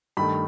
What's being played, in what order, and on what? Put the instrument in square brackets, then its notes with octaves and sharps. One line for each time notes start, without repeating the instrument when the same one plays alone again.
[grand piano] G2 D#3 A3 B5